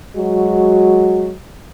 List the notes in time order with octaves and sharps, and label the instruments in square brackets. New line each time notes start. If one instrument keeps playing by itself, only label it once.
[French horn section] F#3 G#3 F#4